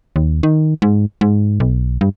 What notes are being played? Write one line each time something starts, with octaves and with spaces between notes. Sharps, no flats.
D#2
D#3
G#2
G#2
B1
G2